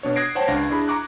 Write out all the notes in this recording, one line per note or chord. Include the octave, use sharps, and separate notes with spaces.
B2 D4 C#5
D#6 F#6 G#6 A#6 C7 D7
C5 C#5 F#5 G5 A5
C#2 D4 F5 A#6
D4 E4 G#4 B5
A#5 C#6 D6 F#6